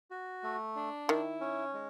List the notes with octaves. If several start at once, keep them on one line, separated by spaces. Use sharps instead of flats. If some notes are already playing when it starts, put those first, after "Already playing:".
F#4
A3
D4
D#3 E4
C#4
G#3